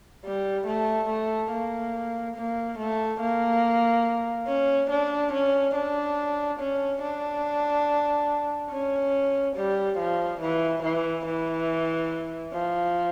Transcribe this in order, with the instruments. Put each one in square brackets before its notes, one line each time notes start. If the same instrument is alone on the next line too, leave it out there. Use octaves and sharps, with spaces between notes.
[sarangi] G3
A3
A3
A#3
A#3
A3
A#3
C#4
D4
C#4
D4
C#4
D4
C#4
G3
F3
E3
E3
E3
F3